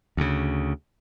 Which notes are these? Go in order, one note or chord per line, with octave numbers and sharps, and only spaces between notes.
D2 C#3